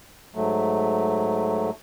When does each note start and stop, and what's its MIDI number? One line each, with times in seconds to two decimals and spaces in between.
0.35 1.70 44
0.35 1.70 54
0.35 1.70 57